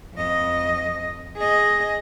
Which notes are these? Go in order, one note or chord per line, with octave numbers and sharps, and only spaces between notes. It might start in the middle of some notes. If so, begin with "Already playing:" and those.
F2 D#5
G#4 D#5